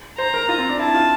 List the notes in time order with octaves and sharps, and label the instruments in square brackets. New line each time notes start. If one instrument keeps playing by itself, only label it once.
[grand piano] C5 [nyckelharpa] A#5
[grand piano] A#4
F4
C4
D4
[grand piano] E4 [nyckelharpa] A5
[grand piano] F4